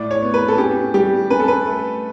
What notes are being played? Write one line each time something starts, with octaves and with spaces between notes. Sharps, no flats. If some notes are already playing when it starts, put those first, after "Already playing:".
Already playing: A2 D5
C#5
B3
B4
A4
C#4 G4
G3 G4
C#4 B4
A4
B4
A3